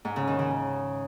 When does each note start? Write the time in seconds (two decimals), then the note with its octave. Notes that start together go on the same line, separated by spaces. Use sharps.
0.05 G#2
0.16 C#3
0.27 D#3
0.39 C#3